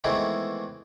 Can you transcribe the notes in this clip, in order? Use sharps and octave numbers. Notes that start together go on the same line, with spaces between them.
D#3 E3 G#3 A3 B3 C4